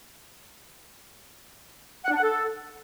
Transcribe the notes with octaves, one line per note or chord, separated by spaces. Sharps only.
F#5
D4
F#5
A4